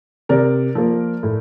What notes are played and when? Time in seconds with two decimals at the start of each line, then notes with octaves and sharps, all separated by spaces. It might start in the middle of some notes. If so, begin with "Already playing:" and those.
0.29 C3 A#4 D5
0.75 F3 A#3
1.23 A2